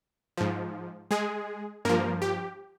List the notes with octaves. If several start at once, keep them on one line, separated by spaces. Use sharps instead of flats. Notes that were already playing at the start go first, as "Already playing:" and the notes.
G#2 F3
G#3 G#4
G2 F3 A#3 A#4
G4